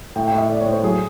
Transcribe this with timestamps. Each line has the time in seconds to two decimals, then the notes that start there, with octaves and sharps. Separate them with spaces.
0.16 A2 G5
0.27 G5
0.32 A2
0.38 E5
0.49 A2 D5
0.61 C#5
0.66 A2
0.72 C5
0.83 F#3 G#4